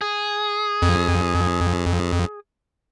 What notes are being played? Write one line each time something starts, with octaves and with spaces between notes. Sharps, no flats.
G#4
F2